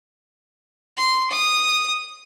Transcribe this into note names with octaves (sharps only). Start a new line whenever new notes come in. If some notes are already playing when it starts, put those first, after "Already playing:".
C6
D#6